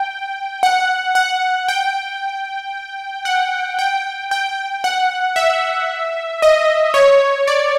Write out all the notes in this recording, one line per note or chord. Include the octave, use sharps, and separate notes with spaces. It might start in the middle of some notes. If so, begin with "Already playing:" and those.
Already playing: G5
F#5
F#5
G5
F#5
G5
G5
F#5
E5
D#5
C#5
D5